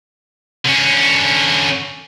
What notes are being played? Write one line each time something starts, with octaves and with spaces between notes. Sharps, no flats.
D3 C#4